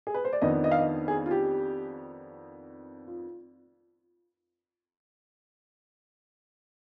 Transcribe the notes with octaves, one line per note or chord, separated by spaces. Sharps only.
G#4
B4
C5
D5
F2 D#3 B3 D4 D#5
D#5
F5
D#5
G#4
F4
G4
F4